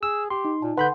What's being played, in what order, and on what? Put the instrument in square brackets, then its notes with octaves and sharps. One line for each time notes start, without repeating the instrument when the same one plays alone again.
[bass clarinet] G#4 [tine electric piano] E6
[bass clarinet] G4 [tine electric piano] C6
[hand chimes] D#4
[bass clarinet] A#2 [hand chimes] A5
[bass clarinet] D3 [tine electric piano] B4 B5 G6 [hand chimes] F#5 A5 C6